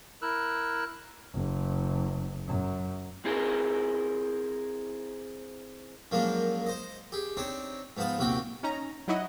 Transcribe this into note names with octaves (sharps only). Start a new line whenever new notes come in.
E4 A#4 E6 F#6
F#1
F#2
C4 E4 G#4 A#4
F#2 F3 G#3 A#3 D4
C5 D#5
G4 G#4
C4 D4 D#4 C#5
G#2 F3 B3 A5 D#6
A#1 D#2 C3 F#4 G5 D6
C#4 D#4 A#5
F#3 D#4 E4 F#4 D#5